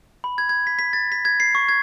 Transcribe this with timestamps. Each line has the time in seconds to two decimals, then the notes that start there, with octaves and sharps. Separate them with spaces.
0.24 B5
0.38 G#6
0.49 G#6
0.67 B6
0.79 B6
0.93 A6
1.12 B6
1.25 G#6
1.40 C7
1.55 C#6
1.69 G#6